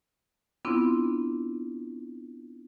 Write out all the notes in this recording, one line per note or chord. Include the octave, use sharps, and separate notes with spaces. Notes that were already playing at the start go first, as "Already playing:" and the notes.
B3 C4 D4 E4 F4